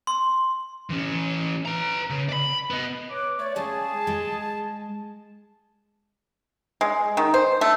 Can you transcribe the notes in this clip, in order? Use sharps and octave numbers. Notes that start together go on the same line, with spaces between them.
C6
E3 C#4
B4 A#5
C#3
D5 B5
B3 D#5
B4 C#5 D6
A3 C#5 D5
C#3 G#3 G#4 A5
G#3
G#3
D#3
C5
A3